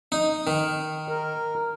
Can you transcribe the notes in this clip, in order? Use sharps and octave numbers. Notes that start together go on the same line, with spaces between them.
D#4
D#3
A#4